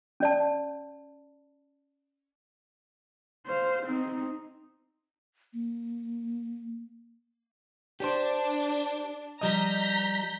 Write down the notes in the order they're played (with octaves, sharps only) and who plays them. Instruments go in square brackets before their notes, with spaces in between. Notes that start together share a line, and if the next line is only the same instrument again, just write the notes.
[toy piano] C#4 D5 A5
[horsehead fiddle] C5 F5
C4 D#4
[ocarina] A#3
[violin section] D4 [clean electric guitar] G4 C5
[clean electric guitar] F3 G3 D#5 [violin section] A#5 G6 B6